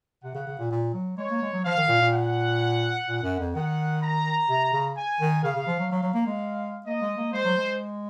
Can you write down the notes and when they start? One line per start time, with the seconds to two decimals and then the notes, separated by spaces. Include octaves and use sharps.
0.23 C3 F#5
0.34 C#3
0.47 C#3
0.59 A#2
0.71 A#2
0.94 F#3
1.17 G#3 C#5
1.30 A#3
1.42 G#3
1.53 F#3
1.65 F3 F5
1.77 D#3
1.88 A#2
2.01 A#2
2.13 F#5
3.07 A#2
3.23 F#2
3.39 F2
3.54 D#3 F#5
4.02 A#5
4.48 C3
4.73 C#3
4.96 G#5
5.20 D#3
5.43 C#3 F5
5.56 C#3
5.67 F3
5.80 F#3
5.91 F#3 F5
6.03 F#3
6.14 A#3
6.26 G#3
6.86 A#3 D#5
7.01 G#3
7.17 A#3
7.33 G#3 C5
7.44 F#3
7.57 G#3